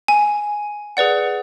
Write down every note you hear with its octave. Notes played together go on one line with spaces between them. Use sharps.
G#5
G#4 B4 D5 F#5